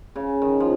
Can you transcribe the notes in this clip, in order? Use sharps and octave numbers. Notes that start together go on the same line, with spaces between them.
C#3
D#3
F3